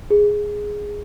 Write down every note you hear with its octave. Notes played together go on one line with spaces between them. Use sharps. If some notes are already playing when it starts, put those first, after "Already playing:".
G#4